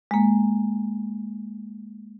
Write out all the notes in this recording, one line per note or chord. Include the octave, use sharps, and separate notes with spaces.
G#3 A#3